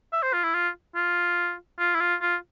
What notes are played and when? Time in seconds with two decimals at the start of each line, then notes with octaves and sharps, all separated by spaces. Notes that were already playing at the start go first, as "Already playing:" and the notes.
0.13 E5
0.23 C5
0.33 F4
0.44 E4
0.54 F4
0.95 F4
1.79 F4
1.95 E4
2.01 F4
2.21 F4